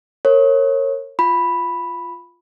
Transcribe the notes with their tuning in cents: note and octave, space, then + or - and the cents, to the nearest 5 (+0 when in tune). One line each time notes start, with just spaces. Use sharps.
A#4 -15 C#5 -25
F4 +0 B5 +0